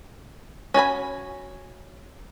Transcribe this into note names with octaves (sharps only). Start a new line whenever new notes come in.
C#4 F#4 G#5 B5